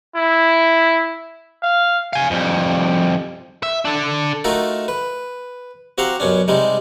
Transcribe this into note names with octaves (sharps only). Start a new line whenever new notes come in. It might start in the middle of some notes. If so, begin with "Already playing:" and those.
E4
F5
F5 G#5
F2 G3
E5
D4 A4
A3 D#4 F4 F#4 A4 A#4
B4
C4 F#4 G4 F5 F#5 A#5
F#2 B2 C#4 D4
C3 G3 G#3 D#4